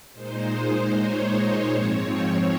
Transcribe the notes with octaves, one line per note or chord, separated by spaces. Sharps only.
A#2 G#3 D#4 C5
C#5
G#2 F3 C4 C#5
C#5